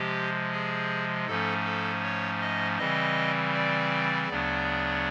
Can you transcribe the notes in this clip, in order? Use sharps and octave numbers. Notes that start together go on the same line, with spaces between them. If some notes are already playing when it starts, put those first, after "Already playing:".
Already playing: C3 F3 G#3 G4
G#4
G#2 F3 A3 C#4 A4
A4
C#5
D#5
C#3 E3 G3 C4 D#5
D5
D2 C#3 F#3 B3 D4